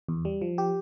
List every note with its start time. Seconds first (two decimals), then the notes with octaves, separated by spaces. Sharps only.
0.08 E2
0.25 G3
0.42 F3
0.58 G4